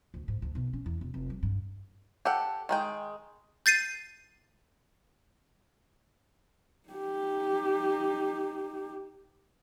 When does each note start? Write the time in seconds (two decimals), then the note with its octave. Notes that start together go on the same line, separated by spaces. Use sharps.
0.14 D2
0.28 G#2
0.42 D2
0.55 B1
0.73 C#4
0.86 E2
1.01 E1
1.14 F1
1.30 G3
1.43 G2
2.25 G4 A4 F#5
2.69 D#3 G#3 G5
3.66 G6 A6 C7 D#7
6.89 D#4 G4